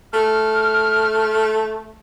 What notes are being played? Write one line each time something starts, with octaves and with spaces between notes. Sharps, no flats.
A3 F6